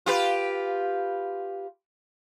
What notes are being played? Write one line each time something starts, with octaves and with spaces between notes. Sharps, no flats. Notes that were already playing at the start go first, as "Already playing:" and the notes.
F4 G4 B4